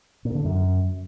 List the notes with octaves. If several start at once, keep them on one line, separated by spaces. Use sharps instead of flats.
A#2
D3
F#2